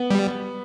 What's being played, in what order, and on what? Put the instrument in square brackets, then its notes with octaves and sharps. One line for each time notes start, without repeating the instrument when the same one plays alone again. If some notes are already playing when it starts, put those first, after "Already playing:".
Already playing: [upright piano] B3
[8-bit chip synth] G3